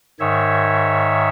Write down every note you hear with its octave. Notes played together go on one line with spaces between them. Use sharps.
G#2 D#3 C#5 E5